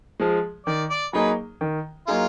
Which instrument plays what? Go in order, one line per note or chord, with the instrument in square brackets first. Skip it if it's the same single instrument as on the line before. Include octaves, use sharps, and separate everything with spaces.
[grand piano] F3 G#3
[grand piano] D#3 [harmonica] D5
[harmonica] D5
[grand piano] F#3 A#3 D#4 G#4 [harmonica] B4
[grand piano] D#3
[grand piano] F#3 A#3 D#4 G#4 [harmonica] F4